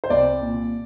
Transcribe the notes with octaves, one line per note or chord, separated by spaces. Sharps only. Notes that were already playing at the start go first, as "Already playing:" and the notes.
C5
C2 D5
A#2